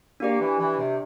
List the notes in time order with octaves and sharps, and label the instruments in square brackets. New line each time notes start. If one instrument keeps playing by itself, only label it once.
[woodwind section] A#3 [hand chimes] D4 G4 D5
[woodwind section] E3
E3
C3